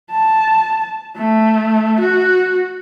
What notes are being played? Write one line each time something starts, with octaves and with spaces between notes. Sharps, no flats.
A5
A3
F#4